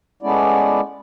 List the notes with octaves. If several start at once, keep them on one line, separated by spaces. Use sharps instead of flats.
G#3 A3 B3 C#4 E4 D5